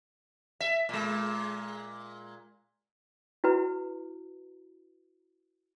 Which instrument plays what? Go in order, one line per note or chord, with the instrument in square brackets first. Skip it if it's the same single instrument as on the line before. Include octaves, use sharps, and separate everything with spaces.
[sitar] E5
A#2 G#3
[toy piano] E4 F#4 B4 A#5